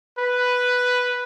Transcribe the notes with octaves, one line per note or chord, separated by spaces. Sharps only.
B4